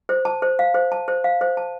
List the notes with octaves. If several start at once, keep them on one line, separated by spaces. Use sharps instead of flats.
C5
A5
C5
F5
C5
A5
C5
F5
C5
A5